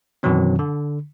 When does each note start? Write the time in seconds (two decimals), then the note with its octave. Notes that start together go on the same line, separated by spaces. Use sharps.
0.23 F#2 B2 D#3 E3 F#3 C4
0.59 D3